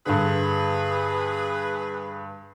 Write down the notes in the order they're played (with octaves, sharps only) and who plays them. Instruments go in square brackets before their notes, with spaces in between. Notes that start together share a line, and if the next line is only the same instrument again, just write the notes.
[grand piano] G2 D3 [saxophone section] G#4 B4